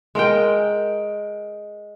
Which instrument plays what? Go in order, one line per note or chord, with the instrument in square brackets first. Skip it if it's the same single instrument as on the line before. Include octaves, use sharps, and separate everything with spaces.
[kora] G#3 A#4 D#5 G5